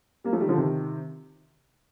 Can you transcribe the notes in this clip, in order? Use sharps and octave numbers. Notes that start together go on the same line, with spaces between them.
G3 A#3
F3 A3
D#3 G3
D3 F3
C3 D#3